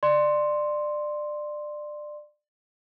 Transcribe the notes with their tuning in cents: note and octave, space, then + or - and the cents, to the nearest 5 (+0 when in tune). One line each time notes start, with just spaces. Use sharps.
D5 +25 C6 +0